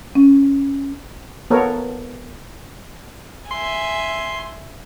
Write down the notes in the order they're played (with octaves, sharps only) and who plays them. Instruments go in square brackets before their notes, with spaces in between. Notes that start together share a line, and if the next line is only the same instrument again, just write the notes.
[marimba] C#4
[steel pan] B3 A4 A#4 C#5
[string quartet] E5 G#5 [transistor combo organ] C6